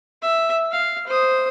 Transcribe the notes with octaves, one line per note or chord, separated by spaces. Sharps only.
E5
F5
C5 D#6